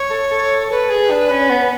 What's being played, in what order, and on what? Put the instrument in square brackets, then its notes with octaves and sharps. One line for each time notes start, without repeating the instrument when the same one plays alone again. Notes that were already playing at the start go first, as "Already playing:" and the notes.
Already playing: [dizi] C#5
[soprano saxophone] A4
A4
[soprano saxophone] A4 [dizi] B4
[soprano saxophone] G#4
D4
C#4
B3